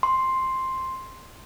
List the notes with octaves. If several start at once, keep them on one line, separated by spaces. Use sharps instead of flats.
C6